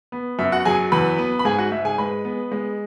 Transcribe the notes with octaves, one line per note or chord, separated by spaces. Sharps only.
B3
F#2 E5
F#4 F#5
F#3 G#4 G#5
E2 B4 B5
B3
B5
G#2 G#4 G#5
F#4 F#5
G#2 E5
G#4 G#5
G#3 B4 B5
B3
G#3